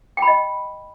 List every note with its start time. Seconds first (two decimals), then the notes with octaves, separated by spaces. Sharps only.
0.17 G5
0.22 B5
0.27 D#5